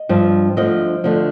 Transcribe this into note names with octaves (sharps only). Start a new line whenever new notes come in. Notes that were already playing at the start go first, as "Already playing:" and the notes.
Already playing: D#5
G2 F3
D2 D3 F3 D#5
D2 D3 F3